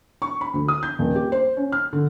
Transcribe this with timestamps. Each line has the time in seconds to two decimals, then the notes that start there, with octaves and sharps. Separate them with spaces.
0.22 C#6
0.41 B5
0.54 D2
0.68 D#6
0.83 G6
0.99 D#1
1.15 G4
1.32 C5
1.57 C#4
1.72 F6
1.93 D3